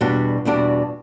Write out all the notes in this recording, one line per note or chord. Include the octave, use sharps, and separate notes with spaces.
E2 B2 G3 D4 F#4
E2 B2 G3 D4 F#4